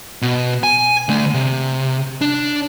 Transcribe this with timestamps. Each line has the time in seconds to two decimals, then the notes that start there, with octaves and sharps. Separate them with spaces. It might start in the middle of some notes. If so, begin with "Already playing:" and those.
0.22 B2
0.63 G#5
1.09 D3 A3
1.34 C3
2.21 D4